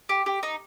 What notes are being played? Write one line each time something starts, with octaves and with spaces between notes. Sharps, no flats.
G4
G4
D#4